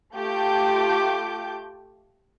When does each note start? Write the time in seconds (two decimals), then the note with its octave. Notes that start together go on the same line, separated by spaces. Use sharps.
0.15 A3 F4 G4 A5 D6 G6